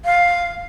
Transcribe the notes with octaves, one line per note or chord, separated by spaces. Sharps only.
F5